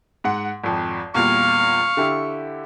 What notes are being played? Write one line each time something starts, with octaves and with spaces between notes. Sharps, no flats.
G#2 F#5
G#1 F2
E2 A#2 G3 F5 C#6
D3 E4 G4